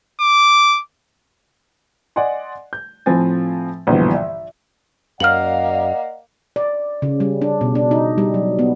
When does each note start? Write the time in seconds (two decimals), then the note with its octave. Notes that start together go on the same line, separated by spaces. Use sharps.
0.21 D6
2.16 D5 D#5 F#5 G#5 C6
2.73 G6
3.06 A2 F3 C4 G#5 A6
3.87 A#1 G2 B2 D3 E3
4.12 D5 E5
5.20 F#2 A#3 D5 D#5 F5 F#5 F6 F#7
6.56 D5
7.02 C#3
7.20 G3
7.42 D4
7.61 B2
7.75 D4
7.91 D#4
8.18 G3
8.34 F#3
8.59 B3